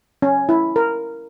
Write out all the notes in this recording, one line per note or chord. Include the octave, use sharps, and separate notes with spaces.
C#4
E4
A#4